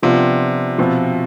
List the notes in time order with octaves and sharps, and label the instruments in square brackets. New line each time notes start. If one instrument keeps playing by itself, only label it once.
[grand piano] C3 [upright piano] F3 B3 D4 F4
[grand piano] B2 [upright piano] F3 C4 F4